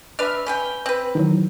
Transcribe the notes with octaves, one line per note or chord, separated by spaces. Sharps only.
D4 B4 E5 F6
C#4 B4 G5
C4 B4
D#3 E3 F#3